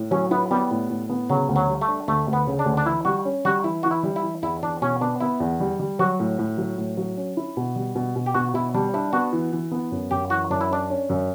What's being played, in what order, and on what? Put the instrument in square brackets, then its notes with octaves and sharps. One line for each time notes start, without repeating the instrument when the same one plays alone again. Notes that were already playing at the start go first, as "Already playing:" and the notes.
Already playing: [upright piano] A2
[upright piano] F#3 [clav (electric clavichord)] C#4
[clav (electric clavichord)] B3 [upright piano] E4
[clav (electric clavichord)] G3 [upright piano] B3
[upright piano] A2
A2
B3
[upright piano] C#3 [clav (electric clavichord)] F#3
[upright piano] D2
[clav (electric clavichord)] F#3
[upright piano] G3
[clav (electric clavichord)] A3
[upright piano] D4
[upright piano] D2 [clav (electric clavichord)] A3
[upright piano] D2
[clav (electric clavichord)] B3
[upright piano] C#3
[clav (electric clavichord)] D4
[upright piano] D2
[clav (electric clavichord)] D4
[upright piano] E3 [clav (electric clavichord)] E4
[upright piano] G3 [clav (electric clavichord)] F#4
[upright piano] C#4
[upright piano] G3 [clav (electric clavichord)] F#4
[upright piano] E3 [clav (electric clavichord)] E4
[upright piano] E3 [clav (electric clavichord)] F#4
[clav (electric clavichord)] E4
[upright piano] G3
[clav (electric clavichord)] E4
[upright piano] E3
[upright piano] E2 [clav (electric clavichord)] E4
[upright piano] E2 [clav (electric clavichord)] D4
[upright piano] B2 [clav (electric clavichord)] C#4
[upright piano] B3 [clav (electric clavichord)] D4
[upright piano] B3 [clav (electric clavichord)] E4
[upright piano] E2
G3
G3
[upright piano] F#3 [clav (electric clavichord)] F#4
[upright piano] A2
A2
F#3
A2
F#3
C#4
E4
B2
G3
B2
B2
[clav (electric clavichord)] G4
[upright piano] B2 [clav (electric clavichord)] F#4
[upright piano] B2 [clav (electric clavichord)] E4
[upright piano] G3 [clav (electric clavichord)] D4
[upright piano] D4 [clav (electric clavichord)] E4
[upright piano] B3 [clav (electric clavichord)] F#4
[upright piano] E3
E3
B3
F#2
[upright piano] F#2 [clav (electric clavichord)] G4
[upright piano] E3 [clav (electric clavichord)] F#4
[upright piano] F#2 [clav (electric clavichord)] D4
[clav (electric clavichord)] E4
[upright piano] C#4 [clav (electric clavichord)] D4
[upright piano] C#4
F#2